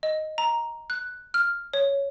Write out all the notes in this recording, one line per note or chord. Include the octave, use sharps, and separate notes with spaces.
D#5
A#5
F#6
F6
C#5